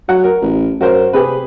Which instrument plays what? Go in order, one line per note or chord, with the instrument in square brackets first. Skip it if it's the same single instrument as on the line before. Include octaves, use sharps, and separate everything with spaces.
[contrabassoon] F#3 [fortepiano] F#5
[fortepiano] A#4
[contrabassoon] A1
[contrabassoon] F#2 [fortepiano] F#4 A#4 C5
[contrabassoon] C3 [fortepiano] G4 G#4 B4